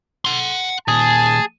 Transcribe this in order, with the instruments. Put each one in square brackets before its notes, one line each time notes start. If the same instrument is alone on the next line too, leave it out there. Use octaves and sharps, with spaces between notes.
[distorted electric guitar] F#5 C6
[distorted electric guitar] A#2 D#3 [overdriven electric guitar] G#4 [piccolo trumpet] A5